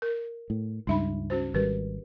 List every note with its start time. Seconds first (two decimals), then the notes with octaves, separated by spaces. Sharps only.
0.02 A#4
0.50 A2
0.87 C#2 G2 D#4 E5 B5
1.30 C#4 F#4 C5
1.54 G#1 G3 G4 A#4 B4